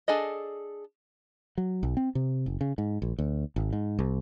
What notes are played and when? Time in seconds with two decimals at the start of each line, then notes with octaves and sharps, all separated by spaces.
0.08 D4 G#4 A4 D#5
1.58 F#3
1.83 B1
1.97 C4
2.15 C3
2.46 F#1
2.61 C#3
2.78 G#2
3.02 A#1
3.19 D2
3.56 G#1
3.73 G#2
3.99 C2